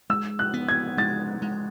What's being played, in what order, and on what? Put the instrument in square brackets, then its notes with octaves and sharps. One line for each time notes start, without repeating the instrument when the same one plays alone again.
[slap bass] G#3 [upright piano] E6
[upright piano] F#6
[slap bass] B3
[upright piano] G#6
[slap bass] G#3 [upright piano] A6
[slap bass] G#3